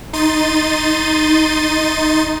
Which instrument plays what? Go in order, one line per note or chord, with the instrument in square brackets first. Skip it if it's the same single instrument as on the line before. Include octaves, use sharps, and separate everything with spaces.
[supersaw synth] D#4 C6 A6 D#7